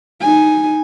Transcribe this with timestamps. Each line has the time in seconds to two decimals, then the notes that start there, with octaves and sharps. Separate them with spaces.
0.21 D#4 G#5